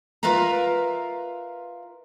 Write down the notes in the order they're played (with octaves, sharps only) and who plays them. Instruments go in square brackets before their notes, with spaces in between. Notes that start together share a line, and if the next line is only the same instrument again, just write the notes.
[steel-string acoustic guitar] F4 A#4 B4 E5 F5 A#5